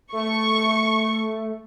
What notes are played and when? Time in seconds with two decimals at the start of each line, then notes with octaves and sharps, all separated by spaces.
0.12 A3 C#6